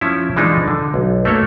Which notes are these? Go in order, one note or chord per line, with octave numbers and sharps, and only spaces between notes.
F3 C#4 E4
E3 F3 G#3 D4 D#4
D3
B1
A3 A#3 A4 C#5